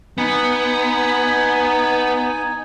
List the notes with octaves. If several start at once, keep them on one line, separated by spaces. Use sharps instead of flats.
B3 D#4 G#5